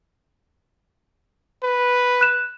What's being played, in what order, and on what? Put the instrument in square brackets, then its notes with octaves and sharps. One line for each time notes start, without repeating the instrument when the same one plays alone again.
[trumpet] B4
[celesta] F#6 E7